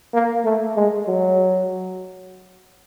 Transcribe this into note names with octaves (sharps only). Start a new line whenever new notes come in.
A#3
A3
G#3
F#3